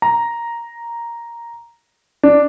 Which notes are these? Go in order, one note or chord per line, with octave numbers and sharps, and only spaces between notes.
A#5
D4